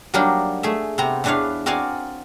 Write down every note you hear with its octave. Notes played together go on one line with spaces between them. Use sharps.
F#3 G3 A#3 D4 D#4 A#4
A3 G#4 E5
C3 B3 C4 A#5
E2 E3 D4 B4 C#5 F5
C4 F#4 A#4 D5 F5 G#5